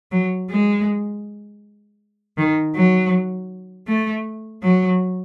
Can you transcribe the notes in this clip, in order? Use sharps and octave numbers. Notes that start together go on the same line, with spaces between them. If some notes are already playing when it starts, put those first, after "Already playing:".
F#3
G#3
D#3
F#3
A3
F#3